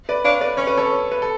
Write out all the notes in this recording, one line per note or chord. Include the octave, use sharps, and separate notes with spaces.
B4 D5
D4 C#5 F5
B4 D5
C#4 C#5
B4
A4 C#5
B4
A4